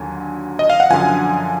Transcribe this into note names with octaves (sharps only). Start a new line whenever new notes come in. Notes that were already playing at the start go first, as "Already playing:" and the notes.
Already playing: D#2 D3 F#3 G#5
D#5
F5
F#5
F#2 D3 F3 G#5